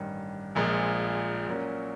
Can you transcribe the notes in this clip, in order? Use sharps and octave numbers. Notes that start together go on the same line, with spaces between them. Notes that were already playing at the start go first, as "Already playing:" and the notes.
Already playing: A1 G2 D#3
A#1 A#2 F3 G#3
A#2 F#3 A#3 C#4 F#4